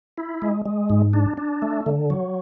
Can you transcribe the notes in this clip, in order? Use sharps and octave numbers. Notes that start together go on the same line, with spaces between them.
E4
G#3
G#3
G#2
D4
D4
A3
D3
F#3